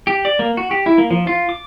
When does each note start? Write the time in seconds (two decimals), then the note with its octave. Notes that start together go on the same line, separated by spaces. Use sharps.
0.07 G4
0.25 D5
0.39 A#3
0.57 F#4
0.71 G4
0.86 E4
0.98 A#3
1.11 F3
1.27 F4
1.49 D6